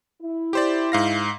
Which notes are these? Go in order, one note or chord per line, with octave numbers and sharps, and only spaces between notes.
E4
G4 C5 D5
G#2 F5 A#6